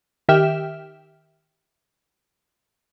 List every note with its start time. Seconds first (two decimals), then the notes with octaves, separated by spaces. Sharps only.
0.28 D#3 G4 E5 G5 F6 E7